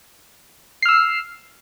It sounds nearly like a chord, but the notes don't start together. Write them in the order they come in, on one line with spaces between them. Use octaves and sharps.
C7 F6 E6